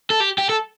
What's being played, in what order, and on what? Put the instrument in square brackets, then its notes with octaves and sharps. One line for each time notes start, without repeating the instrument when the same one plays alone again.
[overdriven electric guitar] A4
G4
G4
A4